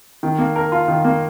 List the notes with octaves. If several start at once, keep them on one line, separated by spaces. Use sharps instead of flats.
D#3
A#3
A#4
F4
D#3
A#3